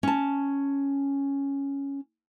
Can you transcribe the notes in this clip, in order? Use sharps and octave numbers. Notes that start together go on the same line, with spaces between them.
C#4 A5